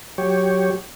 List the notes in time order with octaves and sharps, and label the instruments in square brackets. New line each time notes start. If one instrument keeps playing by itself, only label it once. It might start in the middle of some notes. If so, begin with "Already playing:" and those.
[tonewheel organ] F#3 G4 C#5